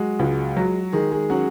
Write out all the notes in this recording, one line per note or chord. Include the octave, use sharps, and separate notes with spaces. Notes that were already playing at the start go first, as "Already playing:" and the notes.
Already playing: F#3 G#3 F#4
C#2
F#3
D#3 G#3 G#4
G#3 G#4
F#3 C#4 F#4